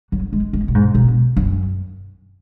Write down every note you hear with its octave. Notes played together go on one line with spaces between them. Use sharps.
F#3
G#3
G#3
B2
G#2
B2
F#2